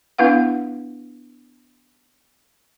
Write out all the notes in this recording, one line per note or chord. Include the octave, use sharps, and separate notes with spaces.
B3 D4 E4 B4 F5 F#5